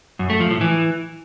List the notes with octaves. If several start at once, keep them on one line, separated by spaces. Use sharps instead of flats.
F#2
A3
F3
A2
E3